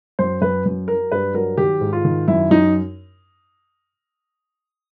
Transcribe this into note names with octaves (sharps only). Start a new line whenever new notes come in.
F#2 C5
F#2 B4
F#2
F#3 A#4
G2 B4
F#3 A#4
D#3 G4
G#2
F4
D#3
F#2 E4
F#2 D#4